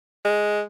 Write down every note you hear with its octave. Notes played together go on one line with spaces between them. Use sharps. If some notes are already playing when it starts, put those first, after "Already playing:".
G#3